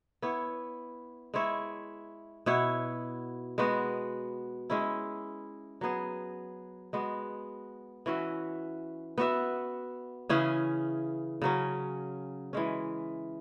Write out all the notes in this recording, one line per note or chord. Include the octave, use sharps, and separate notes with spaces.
B3 E4 C#5
G#3 E4 C#5 E5
B2 B3 E4 C#5
G#3 B3 F#4
G#3 C#4 E4
F#3 B3 G#4
G#3 B3 F#4
E3 C#4 F#4 E5
B3 F#4 E5
C#3 E3 C#4 G#4
C#3 F#3 C#4
E3 G#3 C#4